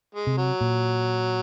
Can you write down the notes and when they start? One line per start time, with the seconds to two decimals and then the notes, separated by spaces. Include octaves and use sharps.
0.15 G#3
0.27 C3
0.38 F#3
0.61 A#2